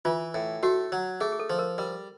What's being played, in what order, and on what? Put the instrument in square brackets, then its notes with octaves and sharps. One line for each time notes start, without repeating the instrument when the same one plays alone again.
[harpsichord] E3 [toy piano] F4
[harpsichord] A2
[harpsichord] A3 [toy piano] F#4
[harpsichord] F#3
[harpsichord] A3 [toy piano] G#4
[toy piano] G#4
A4
[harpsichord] F3
[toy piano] A#4
[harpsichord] G3 [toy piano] A#4